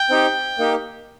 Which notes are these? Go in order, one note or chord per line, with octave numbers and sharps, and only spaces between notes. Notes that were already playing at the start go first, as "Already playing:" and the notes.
Already playing: G5
C4 D#4 G4
A#3 D#4 G4